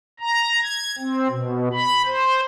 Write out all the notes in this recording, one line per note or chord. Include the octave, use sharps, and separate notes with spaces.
A#5
G#6
C4
B2
B5
C5